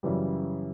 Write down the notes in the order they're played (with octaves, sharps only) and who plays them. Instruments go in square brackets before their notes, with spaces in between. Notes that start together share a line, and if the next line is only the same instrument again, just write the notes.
[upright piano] F#2 C#3 E3 G3